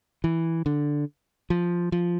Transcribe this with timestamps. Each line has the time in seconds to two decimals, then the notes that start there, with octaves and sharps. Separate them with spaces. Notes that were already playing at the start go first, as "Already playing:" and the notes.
0.24 E3
0.66 D3
1.50 F3
1.92 F3